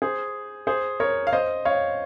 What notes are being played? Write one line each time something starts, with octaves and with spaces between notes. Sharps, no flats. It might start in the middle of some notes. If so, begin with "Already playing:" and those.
G#4 C5
G#4 C5
A#4 C#5
F5
C5 D#5
C#5 F5